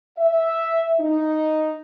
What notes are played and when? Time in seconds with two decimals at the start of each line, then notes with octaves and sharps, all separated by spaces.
0.18 E5
1.00 D#4